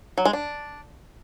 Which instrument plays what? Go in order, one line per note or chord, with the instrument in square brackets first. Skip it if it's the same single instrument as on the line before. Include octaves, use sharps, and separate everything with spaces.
[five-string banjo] F#3
G#3
D4